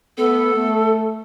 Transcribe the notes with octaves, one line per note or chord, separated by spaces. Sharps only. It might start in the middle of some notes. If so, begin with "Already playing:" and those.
A3 B3 A4
A3